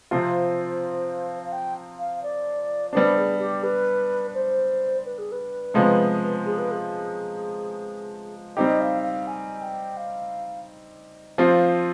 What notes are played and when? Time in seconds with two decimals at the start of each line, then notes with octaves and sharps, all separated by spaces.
0.11 C3 F3 C4 F4 C5
1.43 F5
1.52 G5
1.99 F5
2.23 D5
2.93 G3 B3 D4 C5
3.17 G#4
3.40 G4
3.63 B4
4.34 C5
5.05 B4
5.18 G#4
5.32 B4
5.74 C3 F3 G#3 B3
6.45 G#4
6.59 B4
6.71 G#4
8.56 G3 C4 D#4 G4 D#5
8.81 F5
9.03 F5
9.27 G#5
9.62 G5
9.97 F5
11.38 F3 C4 F4